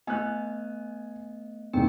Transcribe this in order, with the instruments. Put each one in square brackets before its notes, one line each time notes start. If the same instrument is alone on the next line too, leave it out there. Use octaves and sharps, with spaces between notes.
[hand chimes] A3 B3 D#5 [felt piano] G#5 F#6
[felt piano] A#1 E2 [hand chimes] D#4 G5